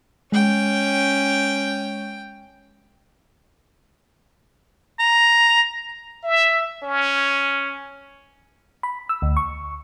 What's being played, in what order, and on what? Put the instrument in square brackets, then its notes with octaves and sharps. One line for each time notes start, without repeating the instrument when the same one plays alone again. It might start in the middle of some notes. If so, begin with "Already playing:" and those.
[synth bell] G#3 [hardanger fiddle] C#4 G5
[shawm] A#5
[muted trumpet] E5
C#4
[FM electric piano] B5
E6
D2
C#6